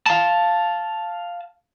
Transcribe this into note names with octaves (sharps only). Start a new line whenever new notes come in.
F5 A5